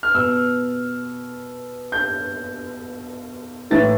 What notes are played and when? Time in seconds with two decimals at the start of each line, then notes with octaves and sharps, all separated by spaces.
0.03 F6
0.15 B2 E6
1.92 G6
3.71 A2 E3 A6